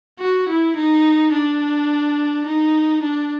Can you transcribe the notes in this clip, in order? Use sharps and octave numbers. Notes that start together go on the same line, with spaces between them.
F#4
E4
D#4
D4
D#4
D4